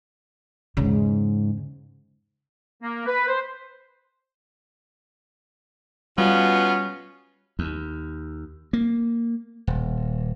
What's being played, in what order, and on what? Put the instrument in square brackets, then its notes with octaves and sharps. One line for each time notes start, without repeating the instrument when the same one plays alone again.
[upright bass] E2 C#3 [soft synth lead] G#2
[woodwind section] A#3
B4
C5
[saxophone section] B2 F4 [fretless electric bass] G3 [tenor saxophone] B3 [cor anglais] C#4
[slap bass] D#2
A#3
D#1